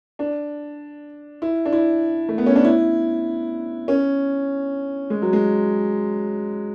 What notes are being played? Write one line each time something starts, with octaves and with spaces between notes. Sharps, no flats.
D4
E4
D4
E4
A3
B3
C#4
D4
E4
C#4
G#3
F#3
G#3